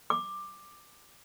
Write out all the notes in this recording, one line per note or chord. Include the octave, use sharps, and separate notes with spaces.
D6